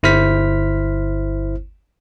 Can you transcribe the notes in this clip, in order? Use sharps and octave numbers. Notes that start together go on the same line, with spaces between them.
G1 E4 C5 F6 B6